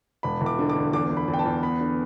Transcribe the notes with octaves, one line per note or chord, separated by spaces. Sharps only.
E1 B5
E1
D6
D3
D6
D2
E2 D6
E2
B5
E2
G5
A5
E2
B3 B5
D3